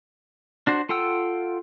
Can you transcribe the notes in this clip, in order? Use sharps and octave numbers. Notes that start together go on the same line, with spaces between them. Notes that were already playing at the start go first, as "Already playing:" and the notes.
D4 F#4 C5
F4 A4 F#5 G5 E6